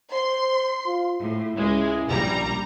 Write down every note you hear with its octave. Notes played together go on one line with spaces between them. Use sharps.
C5 C6
F4
A2 E4
C#2 G#3
A#1 G3 A#5